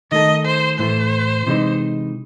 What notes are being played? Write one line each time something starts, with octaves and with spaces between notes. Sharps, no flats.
D#3 A3 D#4 A4 D#5
C5
A2 E3 A3 C5
C3 E3 G#3 D#4